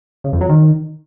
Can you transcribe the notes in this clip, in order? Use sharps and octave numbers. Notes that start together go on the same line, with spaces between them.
C#3
F2
F#3
D#3